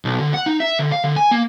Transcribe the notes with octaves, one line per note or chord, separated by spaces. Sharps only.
B1
D3
F#5
D#4
E5
D3
F5
D3
G#5
A#3